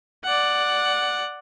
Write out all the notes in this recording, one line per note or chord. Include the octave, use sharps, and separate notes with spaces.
D5 F#5